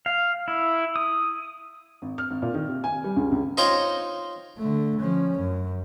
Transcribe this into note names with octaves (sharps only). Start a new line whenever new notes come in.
F5
E4
D#6
G#1
F6
G#1
A#2
D#3
C3
G#5
G3
C#2
C#2
D#4 F4 C5 C#5 G5 A#5
D3 A3
F3 C#4
F#2